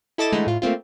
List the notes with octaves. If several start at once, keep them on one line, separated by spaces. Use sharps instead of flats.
E4 A4 D#5 D6 A6 E7
D3 E3 G#3 A3 D#4 E4
A2 F4
A3 A#3 C4 F4